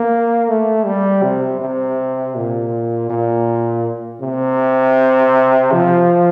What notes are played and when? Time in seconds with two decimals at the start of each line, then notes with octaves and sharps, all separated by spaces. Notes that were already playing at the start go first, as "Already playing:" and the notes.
Already playing: A#3
0.48 A3
0.85 G3
1.23 C3
1.61 C3
2.35 A#2
3.10 A#2
4.22 C3
5.72 F3